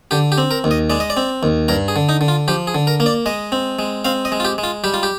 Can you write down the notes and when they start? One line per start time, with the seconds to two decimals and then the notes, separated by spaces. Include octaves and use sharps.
0.11 D3 G4
0.32 G4
0.38 C4
0.51 A#4
0.64 D#2
0.71 D#5
0.90 G#3 D5
1.00 D#5
1.10 D5
1.17 C4
1.43 D#2
1.68 G2 A#4
1.88 G#4
1.96 D3
2.09 D#4
2.21 D3
2.28 F4
2.48 F3 G4
2.67 G#4
2.75 D3
2.87 A#4
3.00 A#3
3.06 D5
3.26 G#3 D#5
3.52 C4
3.79 G#3
4.05 C4 F5
4.25 D#5
4.32 G#3
4.40 F4
4.45 G4
4.58 G#3
4.64 F4
4.84 G3 G4
4.94 F4
5.03 G4